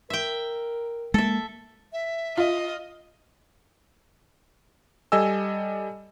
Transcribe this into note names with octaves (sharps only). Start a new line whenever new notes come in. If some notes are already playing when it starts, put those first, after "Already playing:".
A#4 E5 G5
G#3 A#3 A4 E5
E5
F4 D#5
G3 A4 D#5 G#5 E6